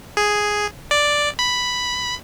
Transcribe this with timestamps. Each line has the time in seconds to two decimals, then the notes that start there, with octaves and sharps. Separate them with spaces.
0.17 G#4
0.91 D5
1.39 B5